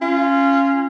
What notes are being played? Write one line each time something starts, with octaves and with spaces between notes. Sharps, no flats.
C#4 F4